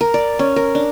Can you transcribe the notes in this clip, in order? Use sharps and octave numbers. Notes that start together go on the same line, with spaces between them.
A#4
D5
C#4
A#4
D4